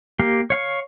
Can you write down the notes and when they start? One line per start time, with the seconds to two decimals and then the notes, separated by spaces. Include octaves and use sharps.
0.19 A#3 G4 F5
0.50 C#5 F5 C#6